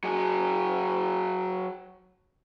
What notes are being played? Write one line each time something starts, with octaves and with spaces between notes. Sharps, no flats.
F#3 G#4